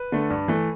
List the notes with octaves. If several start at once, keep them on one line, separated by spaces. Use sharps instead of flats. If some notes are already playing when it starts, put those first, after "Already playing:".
Already playing: B4
D3 A3
G2
E3 A3